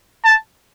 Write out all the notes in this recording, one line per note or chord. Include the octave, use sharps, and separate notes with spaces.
A5